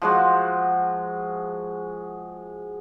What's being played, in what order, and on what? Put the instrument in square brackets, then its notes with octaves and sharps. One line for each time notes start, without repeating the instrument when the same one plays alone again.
[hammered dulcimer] F3 G#3 F#4